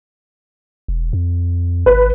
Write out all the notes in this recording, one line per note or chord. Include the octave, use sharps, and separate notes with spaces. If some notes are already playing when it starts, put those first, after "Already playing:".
E1
F2
G#1 B4